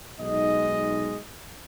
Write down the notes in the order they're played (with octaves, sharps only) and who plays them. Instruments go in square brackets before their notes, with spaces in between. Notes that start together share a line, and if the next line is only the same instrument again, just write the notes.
[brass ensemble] B1 G#3 D#4 D#5